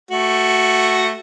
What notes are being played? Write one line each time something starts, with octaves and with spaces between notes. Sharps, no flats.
A3 F#4